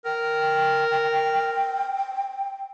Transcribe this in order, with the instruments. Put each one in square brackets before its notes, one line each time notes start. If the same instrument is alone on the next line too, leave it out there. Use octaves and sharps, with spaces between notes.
[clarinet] A#4 [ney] G5